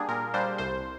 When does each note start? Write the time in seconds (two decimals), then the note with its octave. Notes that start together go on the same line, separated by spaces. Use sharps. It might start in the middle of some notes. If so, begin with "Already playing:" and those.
Already playing: G3 A#3 D4 G#4
0.09 A#2 A#4
0.34 G3 A#3 D4 C5
0.58 C2 C5